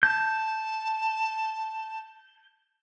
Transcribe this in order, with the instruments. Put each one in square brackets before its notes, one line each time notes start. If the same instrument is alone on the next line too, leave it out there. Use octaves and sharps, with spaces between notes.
[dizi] A5 [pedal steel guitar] G6